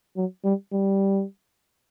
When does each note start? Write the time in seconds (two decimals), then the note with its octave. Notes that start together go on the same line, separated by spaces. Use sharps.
0.17 F#3
0.45 G3
0.73 G3